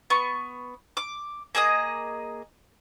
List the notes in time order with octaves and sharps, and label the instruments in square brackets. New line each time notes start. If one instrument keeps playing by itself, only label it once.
[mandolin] B3 C#6
D6
A#3 G#4 D#5 D#6